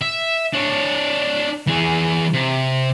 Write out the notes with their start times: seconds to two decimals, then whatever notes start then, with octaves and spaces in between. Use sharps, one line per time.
0.01 E5
0.54 D4 C#5
1.67 E3 G#4
2.33 C3